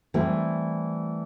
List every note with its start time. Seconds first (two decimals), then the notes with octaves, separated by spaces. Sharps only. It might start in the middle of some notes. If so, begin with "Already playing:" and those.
0.14 A2 E3 G3 C4